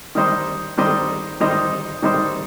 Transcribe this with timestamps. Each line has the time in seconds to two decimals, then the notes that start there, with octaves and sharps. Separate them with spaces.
0.15 D#3 G3 D#4 C5 D#5
0.78 D#3 G3 D#4 C5 D#5
1.40 D#3 G3 D#4 C5 D#5
2.02 D#3 G3 D#4 C5 D#5